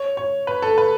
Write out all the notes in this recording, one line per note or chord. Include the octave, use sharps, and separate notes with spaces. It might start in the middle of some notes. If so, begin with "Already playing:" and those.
Already playing: C#5
C#5
B4
A4
B4